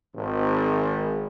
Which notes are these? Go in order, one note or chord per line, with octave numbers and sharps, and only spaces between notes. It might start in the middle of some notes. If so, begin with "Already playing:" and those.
G#1